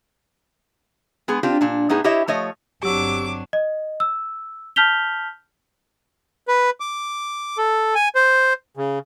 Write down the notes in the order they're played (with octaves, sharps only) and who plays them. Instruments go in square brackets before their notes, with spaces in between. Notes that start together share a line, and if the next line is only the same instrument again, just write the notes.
[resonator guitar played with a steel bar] G#3 B3 G#4
C4 D4 F4 G4
A#2 D4
A2 B3 D#4 G#4
E4 G4 C#5 D#5 E5
F3 A3 C#5 D#5
[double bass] G1 C4 [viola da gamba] F#3 D4 [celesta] G4 E6 [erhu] D6
[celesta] D#5
E6
A5 F6 G6 B6 F7 G7
[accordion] B4
D6
A4
G#5
C5
C#3